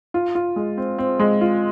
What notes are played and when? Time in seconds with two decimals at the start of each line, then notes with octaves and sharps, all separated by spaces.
0.14 F4
0.35 F4
0.56 G#3
0.78 C4
0.98 C4
1.20 G#3
1.41 F4